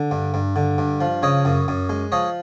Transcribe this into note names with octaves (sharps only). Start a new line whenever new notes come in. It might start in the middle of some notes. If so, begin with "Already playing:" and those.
Already playing: D3
G2
G2
D3
G2
F3
C#3 C#5 D#5
F#2
F#2
G#3
F3 C#5 D#5